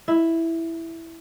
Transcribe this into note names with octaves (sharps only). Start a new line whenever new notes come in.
E4